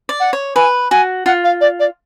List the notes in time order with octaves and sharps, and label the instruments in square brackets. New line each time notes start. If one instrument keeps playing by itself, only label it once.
[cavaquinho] D5
[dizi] F#5
[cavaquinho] C#5
[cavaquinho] B4 [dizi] G#5
[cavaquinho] F#4 [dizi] G#5
[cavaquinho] F4 [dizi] F#5
[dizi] F5
D5
D5